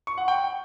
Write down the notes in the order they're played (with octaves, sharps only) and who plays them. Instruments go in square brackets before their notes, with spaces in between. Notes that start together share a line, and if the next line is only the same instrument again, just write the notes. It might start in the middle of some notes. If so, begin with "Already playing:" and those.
[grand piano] C#6
F#5
G5